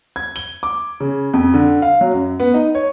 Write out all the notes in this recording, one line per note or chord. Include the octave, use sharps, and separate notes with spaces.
G#6
G7
D6
C#3
F2
D3
F5
F#3
F#2
B3
D#4
C#5